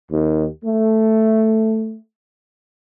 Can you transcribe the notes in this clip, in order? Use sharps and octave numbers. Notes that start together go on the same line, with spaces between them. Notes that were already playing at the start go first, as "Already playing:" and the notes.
D#2
A3